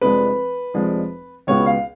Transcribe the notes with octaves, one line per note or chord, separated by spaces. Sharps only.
F1 F2 F3 G#3 D4 B4
F1 F2 F3 G#3 D4
C#2 B2 G#3 B3 F4 C#5
F5